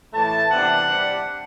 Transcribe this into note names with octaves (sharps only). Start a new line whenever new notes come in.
A2 E3 A3 A5
C3 E3 B3 D4 F#5
C3 G3 D4